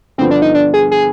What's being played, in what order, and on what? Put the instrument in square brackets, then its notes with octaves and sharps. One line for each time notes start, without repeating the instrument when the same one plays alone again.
[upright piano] G2 D3 F3 B3 [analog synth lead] C4
[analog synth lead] D4
D#4
D4
G#4
G#4